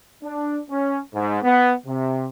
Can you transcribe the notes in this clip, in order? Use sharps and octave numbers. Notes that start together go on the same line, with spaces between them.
D4
C#4
G#2
B3
C3